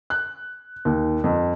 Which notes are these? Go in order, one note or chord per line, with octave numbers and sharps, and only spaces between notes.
F#6
D#2
F2